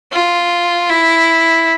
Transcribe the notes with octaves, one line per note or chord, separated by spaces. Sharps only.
F4
E4